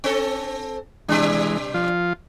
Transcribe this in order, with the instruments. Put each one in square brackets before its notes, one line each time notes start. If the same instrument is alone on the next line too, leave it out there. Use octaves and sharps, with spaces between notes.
[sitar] C4 A4
[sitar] B2 G3 D4 [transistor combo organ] E3 G#3
[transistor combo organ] F3 F4